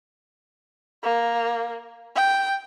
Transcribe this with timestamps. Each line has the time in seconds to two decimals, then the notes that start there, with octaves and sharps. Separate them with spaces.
1.03 A#3
2.15 G5